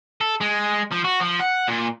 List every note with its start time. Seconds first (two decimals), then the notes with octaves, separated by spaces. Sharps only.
0.21 A4
0.41 G#3
0.92 F3
1.05 F#4
1.20 F3
1.40 F#5
1.68 A#2